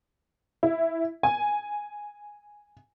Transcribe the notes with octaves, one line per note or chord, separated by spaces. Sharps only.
E4
G#5